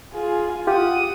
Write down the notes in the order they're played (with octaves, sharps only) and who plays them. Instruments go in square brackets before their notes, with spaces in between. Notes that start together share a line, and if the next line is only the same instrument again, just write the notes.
[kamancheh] F4 G#4
[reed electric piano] F4 G4 [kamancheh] F#5 D#6